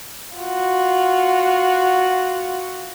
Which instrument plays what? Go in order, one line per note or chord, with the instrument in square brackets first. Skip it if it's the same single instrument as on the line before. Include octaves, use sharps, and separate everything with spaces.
[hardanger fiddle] F4 F#4